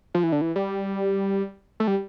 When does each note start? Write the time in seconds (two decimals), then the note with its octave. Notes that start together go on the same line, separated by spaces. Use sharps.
0.14 F3
0.23 E3
0.32 D3
0.41 E3
0.56 G3
1.80 A3
1.87 G3